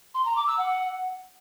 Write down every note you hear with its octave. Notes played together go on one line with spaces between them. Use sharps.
C6
A#5
D6
E6
F#5